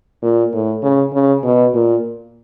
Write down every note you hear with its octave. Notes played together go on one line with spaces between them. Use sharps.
A#2
A2
C#3
C#3
B2
A#2